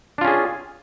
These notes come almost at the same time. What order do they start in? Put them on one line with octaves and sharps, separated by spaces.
D4 F4 C#4 G#4